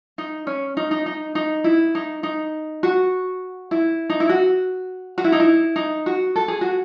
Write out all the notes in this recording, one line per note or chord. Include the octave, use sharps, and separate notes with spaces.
D#4
C#4
D#4
D#4
D#4
D#4
E4
D#4
D#4
F#4
E4
D#4
E4
F#4
F#4
E4
D#4
E4
D#4
F#4
A4
G#4
F#4